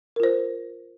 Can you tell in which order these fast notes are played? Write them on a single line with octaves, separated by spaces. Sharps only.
A#4 F4 C5